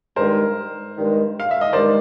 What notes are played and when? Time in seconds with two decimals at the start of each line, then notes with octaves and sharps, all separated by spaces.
0.16 G2 D#3 G#3 A#4 C5
0.95 G2 D#3 G#3
1.40 F5
1.51 E5
1.61 D#5
1.73 G2 D#3 G#3 C5 D5